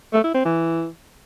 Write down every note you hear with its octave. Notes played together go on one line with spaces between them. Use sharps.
A3
E4
C4
E3